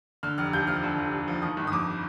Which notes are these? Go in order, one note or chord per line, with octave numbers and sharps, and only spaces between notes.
D3 F6
F1 F6
D#2 G6
F3 F6
D3
F1
D#2
F3
D#3 D#6
G1
D#6
F2 D6